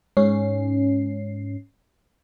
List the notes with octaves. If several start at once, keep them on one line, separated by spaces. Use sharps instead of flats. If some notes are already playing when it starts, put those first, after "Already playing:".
G#2 C#4 C7